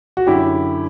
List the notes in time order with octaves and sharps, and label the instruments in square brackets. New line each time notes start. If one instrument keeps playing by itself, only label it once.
[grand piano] F#4
F#2 D3 E4 G4